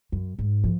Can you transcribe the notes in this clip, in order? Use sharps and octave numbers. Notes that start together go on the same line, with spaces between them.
F#2
G#2
F3